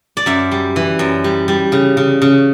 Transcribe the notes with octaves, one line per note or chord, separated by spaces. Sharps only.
D5
F#2 E5
G3
E3
F#2
G3
G3
C#3
C#3
C#3